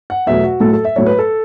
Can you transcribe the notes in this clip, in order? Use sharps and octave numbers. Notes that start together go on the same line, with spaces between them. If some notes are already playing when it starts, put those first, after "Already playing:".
F#5
E2 B2 F#3 A3 E5
F#4
A2 F#3 A3 A4
A4
E5
A2 F#3 A3 C#5
B4
A4